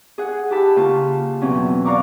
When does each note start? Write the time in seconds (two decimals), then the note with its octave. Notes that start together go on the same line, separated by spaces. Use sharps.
0.18 G#4 F#5
0.50 E4 G4 F#5 A5 B5
0.76 C#3 A#3 F4 A5
1.41 E2 B2 E3 F#3 C4 C#4
1.85 D5 F5 F#5 A#5 C#6 D6